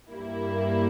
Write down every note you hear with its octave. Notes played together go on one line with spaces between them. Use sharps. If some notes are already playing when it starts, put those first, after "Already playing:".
G2 G3 A#3 E4